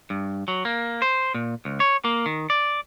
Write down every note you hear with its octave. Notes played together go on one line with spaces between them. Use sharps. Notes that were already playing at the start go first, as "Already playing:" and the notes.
G2
F#3
A#3
C5
A#2
C#2
C#5
A#3
D#3
D5